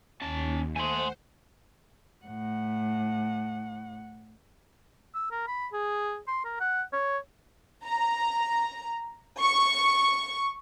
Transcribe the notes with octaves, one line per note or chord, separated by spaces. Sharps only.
D#2 C#4 A5
A3 C5 F#5 G#5 C6
A2 F#5
E6
A#4
B5
G#4
C6
A#4
F#5
C#5
A#5
C#6